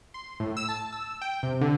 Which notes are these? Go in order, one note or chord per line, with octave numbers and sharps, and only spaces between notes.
C6
A2
E6
A5
E6
G5
C3
D3